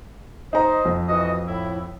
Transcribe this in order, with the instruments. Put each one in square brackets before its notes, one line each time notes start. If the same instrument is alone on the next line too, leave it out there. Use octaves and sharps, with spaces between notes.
[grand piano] D#4 A#5 [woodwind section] C5 D#5
[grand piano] F2
[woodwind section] E3 F#4 D#5
A2 E4